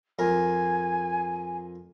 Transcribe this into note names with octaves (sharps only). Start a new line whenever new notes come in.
F2 A#4 G#5